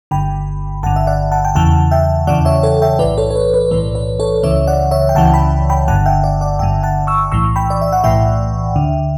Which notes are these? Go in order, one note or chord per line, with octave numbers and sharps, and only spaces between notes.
G1 G2 D3 G5 B5
G1 G2 D3 F#5 A5
E5
D5 F#5
F#5 A5
G5
E2 C#3 E3 F#5 A5
E5 G5
E2 C#3 E3 D5 F#5
C#5 E5
A4 C#5
E5 G5
B1 A2 E3 B4 D5
A4 C#5
C#5
B4
B4
B1 A2 E3 B4
B4
A4 C#5
C#2 C#3 E3 C#5 E5
D5 F#5
C#5 E5
G5
C#2 C#3 E3 F#5 A5
G5 B5
G5 B5
G1 G2 D3 F#5 A5
E5 G5
D5 F#5
D5 F#5
G1 G2 D3 E5 G5
F#5 A5
C#6 E6
B1 A2 E3 C#6 E6
G5 B5
D5
E5
F#5
B1 A2 E3 E5 G5
D2 D3